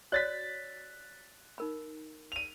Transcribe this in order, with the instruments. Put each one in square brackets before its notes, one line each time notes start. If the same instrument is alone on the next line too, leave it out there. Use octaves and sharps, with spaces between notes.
[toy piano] F#4 C#5 D5 [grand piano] F#6 A6 B6
[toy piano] D#4 A#4 B5
[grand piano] D#7 F7